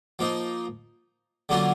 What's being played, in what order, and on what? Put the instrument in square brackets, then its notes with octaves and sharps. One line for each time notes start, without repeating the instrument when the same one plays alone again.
[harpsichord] F3 A#3 D#4
D3 F#3 A#3 C#4 F4